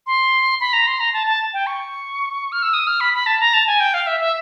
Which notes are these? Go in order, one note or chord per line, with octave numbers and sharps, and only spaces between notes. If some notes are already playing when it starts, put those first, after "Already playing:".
C6
B5
A#5
C6
A#5
A5
A5
G5
C#6
F6
E6
D#6
F6
B5
B5
A5
A#5
A5
G#5
G5
F5
E5
E5